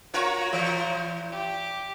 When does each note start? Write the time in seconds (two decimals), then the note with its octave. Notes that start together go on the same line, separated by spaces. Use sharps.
0.14 F4 F#4 A#4 C#5 A#5
0.53 A#2 E3
1.31 G4